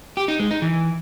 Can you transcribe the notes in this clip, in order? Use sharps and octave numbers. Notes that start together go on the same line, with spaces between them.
G4
D#4
G#3
D#4
E3